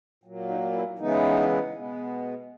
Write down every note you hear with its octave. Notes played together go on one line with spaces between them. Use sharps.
A#2 F#3 A#3
D#4
E4
C#3 E3 G#3 B3 D#4
B2 G#3 B3